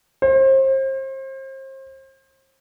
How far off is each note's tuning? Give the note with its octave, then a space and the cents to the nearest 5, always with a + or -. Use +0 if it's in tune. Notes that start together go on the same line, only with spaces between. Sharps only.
C5 +35